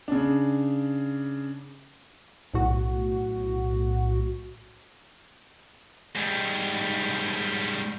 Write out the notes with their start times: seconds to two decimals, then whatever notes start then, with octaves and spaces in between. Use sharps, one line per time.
0.08 C#3 D4
2.54 B1 A2 F#4
6.15 G#2 G3